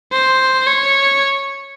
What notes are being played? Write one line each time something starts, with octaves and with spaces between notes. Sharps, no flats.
C5
C#5